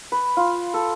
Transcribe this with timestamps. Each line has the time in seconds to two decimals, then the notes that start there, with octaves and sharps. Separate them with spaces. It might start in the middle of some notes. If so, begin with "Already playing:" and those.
0.12 B4
0.37 F4
0.74 A4